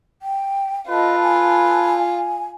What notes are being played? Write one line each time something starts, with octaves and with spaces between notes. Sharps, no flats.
G5
F4 A4 B4 D#5 A5
G#5